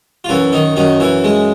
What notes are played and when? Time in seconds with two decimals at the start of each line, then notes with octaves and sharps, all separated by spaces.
0.24 F4
0.29 F#2 E3 E4
0.53 D#3 D#4
0.76 F#2 D#3 D#4
1.00 E3 E4
1.24 G#3